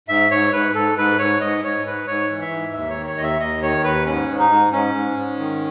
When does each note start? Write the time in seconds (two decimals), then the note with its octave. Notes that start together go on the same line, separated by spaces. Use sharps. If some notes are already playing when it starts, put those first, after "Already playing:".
0.08 G#2 E5
0.31 G#2 C#5
0.53 G#2 B4
0.75 G#2 A4
0.97 G#2 B4
1.19 G#2 C#5
1.41 G#2 D#5
1.64 G#2 C#5
1.86 G#2 B4
2.07 G#2 C#5
2.30 E3
2.41 E5
2.52 G#2
2.73 D#2 E5
2.90 C#5
2.96 D#3
3.06 C#5
3.18 D#2 D#5
3.23 E5
3.40 D#2 D#5
3.62 D#3 C#5
3.84 D#2 B4
4.06 G#2 C#4
4.29 G#2
4.39 D#4
4.50 G#2
4.72 G#2 C#4
4.95 G#2
5.17 G#2
5.39 D#3